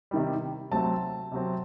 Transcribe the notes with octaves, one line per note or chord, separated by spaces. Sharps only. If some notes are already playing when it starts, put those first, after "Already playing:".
C3 D#3 G3
C3 F#3 A3 C4 A5
C3 F#3 C4